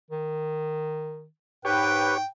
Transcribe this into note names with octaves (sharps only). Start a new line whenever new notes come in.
D#3
G#2 G4 B4 C#5 G5